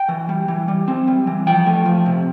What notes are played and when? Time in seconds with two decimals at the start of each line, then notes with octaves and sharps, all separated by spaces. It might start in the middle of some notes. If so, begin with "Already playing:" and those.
Already playing: G5
0.09 E3
0.29 G3
0.48 E3
0.68 G3
0.88 C4
1.08 G3
1.27 E3
1.47 F3 G5
1.66 A3
1.85 F3
2.06 C3